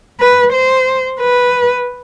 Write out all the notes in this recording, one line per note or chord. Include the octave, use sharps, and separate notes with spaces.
B4
C5
B4